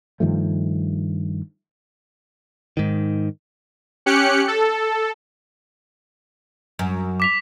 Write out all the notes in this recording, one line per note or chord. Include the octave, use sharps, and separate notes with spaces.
G2 D#3 F3 A3
G#2 D#3
C#4 G4 F#6 C#7
A4
F#2
D6 B6 F7